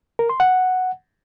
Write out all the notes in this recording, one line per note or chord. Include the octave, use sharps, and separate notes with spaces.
A#4
C6
F#5